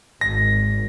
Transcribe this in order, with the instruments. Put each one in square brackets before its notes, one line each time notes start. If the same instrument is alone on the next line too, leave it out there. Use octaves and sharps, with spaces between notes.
[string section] G#1 [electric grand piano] A#6